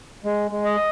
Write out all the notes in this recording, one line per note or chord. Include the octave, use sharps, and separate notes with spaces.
G#3
G#3
D#5